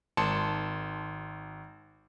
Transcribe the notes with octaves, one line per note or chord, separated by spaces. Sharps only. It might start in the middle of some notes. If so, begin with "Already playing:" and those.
G#1 A5 C6 C#7